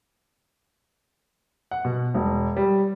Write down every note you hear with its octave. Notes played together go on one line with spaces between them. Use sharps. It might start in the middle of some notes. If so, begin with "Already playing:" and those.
F#5
B2
E1
G3